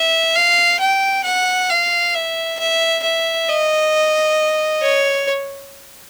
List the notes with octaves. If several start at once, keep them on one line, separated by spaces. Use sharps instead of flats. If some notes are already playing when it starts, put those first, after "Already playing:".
Already playing: E5
F5
G5
F#5
F5
E5
E5
E5
D#5
C#5